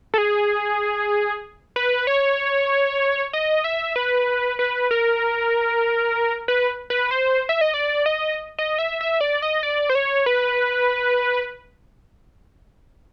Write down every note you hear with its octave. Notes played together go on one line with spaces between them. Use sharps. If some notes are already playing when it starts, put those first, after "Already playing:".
A4
G#4
B4
C#5
D#5
E5
B4
B4
A#4
B4
B4
C5
E5
D#5
D5
D#5
D#5
E5
E5
D5
D#5
D5
C5
C#5
B4